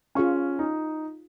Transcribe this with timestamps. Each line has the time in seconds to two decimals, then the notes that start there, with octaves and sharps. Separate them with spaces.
0.15 C#4 F4 G#4 F5 C#6
0.59 D#4